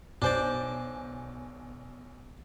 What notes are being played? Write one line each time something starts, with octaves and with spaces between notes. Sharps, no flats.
B1 D4 C5 D5 G#5